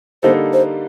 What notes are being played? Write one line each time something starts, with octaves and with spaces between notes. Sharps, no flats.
D3 G3 A#3 D#4 A4 C5
C5